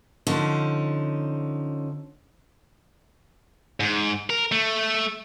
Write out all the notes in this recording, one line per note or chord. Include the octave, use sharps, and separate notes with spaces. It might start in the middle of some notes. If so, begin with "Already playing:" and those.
D3 F3 C#4 D#4
G#2
A#4
A3